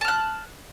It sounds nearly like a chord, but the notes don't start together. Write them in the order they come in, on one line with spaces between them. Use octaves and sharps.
A5 F6 F#6